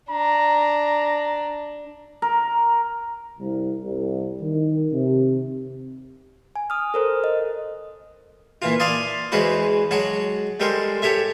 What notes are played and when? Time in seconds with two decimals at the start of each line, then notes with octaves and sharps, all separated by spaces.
0.10 D4 A#5
2.22 A#4
3.39 C2
3.84 C2
4.41 D#3
4.92 C3
6.56 G#5
6.70 D#6 F6
6.94 A4 A#4 C5
7.24 D#5
8.62 A#2 E3 F4
8.80 D5 F5 G#5 A5 C6 D#6
9.32 E2 E3 G#3 F#4 B4 C5
9.91 F#3 G#3 F#4 A5
10.60 G3 G#3 A4 A#4 C5
11.02 G4 A4 C#5 E5